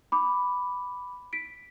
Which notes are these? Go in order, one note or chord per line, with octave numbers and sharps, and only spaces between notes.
B5 D6
B6 D7